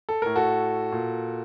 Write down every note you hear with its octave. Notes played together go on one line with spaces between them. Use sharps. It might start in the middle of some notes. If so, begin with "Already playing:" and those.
A4
A2 A#4
F#4 A4
A#2